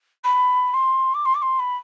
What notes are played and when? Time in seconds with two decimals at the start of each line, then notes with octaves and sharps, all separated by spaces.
0.24 B5
0.73 C6
1.14 D6
1.25 C6
1.34 D6
1.41 C6
1.59 B5